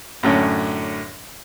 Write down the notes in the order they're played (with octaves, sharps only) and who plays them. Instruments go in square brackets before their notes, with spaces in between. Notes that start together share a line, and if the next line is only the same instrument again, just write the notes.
[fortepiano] F#2 A2 D3 C#4